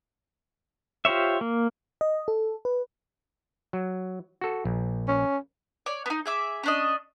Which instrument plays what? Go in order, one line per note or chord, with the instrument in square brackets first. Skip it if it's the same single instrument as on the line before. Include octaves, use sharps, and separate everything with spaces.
[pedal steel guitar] F4 G4 C5 C#5 E5
A#3
[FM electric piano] D#5
A4
B4
[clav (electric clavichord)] F#3
F#4 A4
A#1
[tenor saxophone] C#4
[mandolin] C#5 D5
B3 D#4
G#4 E5 D6
C#4 D4 D#5